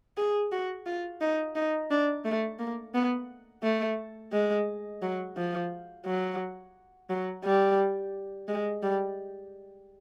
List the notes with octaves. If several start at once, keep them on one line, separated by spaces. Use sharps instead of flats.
G#4
F#4
F4
D#4
D#4
D4
A3
A#3
B3
A3
G#3
F#3
F3
F#3
F#3
G3
G#3
G3